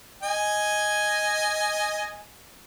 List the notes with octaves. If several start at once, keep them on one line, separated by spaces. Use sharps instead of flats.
D#5 G#5